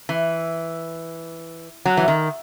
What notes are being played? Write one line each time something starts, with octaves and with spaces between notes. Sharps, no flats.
E3
F#3
E3
D#3